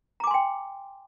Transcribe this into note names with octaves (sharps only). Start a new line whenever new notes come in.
G5 G#5 A#5 C6 D6